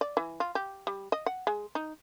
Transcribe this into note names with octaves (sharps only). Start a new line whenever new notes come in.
D5
E3
F4
G4
G3
D#5
F#5
G#3
D#4